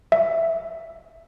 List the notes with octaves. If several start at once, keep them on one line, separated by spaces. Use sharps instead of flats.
E5